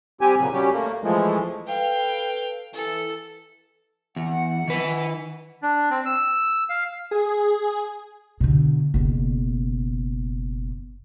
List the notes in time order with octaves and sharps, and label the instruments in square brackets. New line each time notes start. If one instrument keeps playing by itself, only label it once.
[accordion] G3 C4 G4 G#5
A#2 C#3 F#3
F#3 G3 C#4 G4
A3 A#3
E3 F3 G#3 A3
[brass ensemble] A4 B4 [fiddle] F5 G5
[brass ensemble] E3 [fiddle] A4
[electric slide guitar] E2 [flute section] F#5
[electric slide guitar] D#3 B4
[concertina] D4
C4
E6
F5
[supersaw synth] G#4
[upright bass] B2 D3
F#1 B2